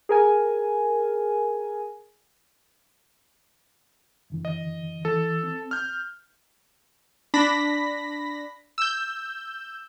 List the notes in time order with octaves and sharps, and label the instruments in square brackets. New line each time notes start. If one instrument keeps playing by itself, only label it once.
[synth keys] G#4 A#4 G#5
[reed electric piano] F#2 D3 E3
[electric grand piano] D#5
[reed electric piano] E3 [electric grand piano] A4
[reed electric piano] C4
[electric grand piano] F6 G6
[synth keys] D4 B5 A#6 B6
E6 G6